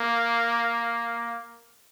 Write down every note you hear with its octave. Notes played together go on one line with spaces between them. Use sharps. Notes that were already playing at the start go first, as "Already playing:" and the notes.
Already playing: A#3